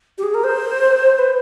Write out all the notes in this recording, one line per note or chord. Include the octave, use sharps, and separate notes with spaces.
G4
G#4
A#4
C5
B4